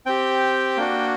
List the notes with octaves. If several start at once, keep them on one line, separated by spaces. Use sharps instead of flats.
C4 G4 G5
A#3 D4 F#4